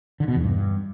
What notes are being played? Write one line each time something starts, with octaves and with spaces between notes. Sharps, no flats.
D3
B2
E2
G2